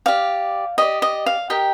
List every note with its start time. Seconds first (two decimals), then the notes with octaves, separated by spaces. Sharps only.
0.06 G4 D5 F5
0.78 G4 D5 D#5
1.02 D#5
1.26 F5
1.50 G4 A#4 D#5 G5